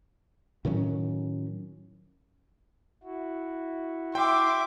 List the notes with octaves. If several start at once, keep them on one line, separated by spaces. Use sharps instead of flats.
A2 D#3 F#3 C#4
E4 F#4
E5 G5 C6 D6